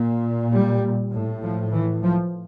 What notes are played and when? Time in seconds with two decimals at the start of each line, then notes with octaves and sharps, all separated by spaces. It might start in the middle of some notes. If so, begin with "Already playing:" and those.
Already playing: A#2
0.52 G3
1.12 A2
1.43 F3
1.73 E3
2.03 F3